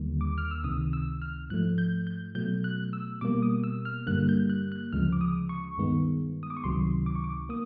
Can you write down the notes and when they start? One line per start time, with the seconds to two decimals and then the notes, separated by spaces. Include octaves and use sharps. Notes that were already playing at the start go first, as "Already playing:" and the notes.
Already playing: D#2 D3 G3 A#3
0.21 D6
0.38 F6
0.51 E6
0.64 C#2 C3 D#3 D#6
0.93 E6
1.22 F6
1.50 G#2 F3 A3 F#6
1.78 G6
2.07 G6
2.35 B2 F#3 A3 G6
2.64 F#6
2.93 E6
3.21 B2 G3 A#3 D6
3.42 D#6
3.64 E6
3.85 F6
4.07 G2 D3 G3 A#3 F#6
4.29 G6
4.50 F#6
4.72 F#6
4.93 D2 C#3 F3 G#3 F6
5.13 D6
5.21 D#6
5.49 C#6
5.78 G2 D#3 G#3 B3
6.43 D#6
6.50 D6
6.57 C#6
6.64 C#2 C3 D#3 F#3 C6
7.06 D6
7.15 C#6
7.24 D6
7.49 A#3 D#6